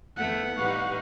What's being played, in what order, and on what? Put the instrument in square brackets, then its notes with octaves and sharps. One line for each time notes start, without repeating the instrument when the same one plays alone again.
[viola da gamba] F2 A3 B3 [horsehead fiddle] F#5
[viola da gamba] A2 G3 D#4 [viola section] G4 B4 F5 [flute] C#6